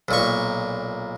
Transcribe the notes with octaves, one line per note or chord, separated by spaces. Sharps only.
B1 A#2 C#6